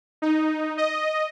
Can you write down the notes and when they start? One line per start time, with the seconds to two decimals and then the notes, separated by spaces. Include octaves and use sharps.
0.22 D#4
0.77 D#5